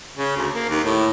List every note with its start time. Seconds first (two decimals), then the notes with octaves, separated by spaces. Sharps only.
0.17 C#3
0.37 D2
0.54 A#3
0.69 D#2
0.84 A2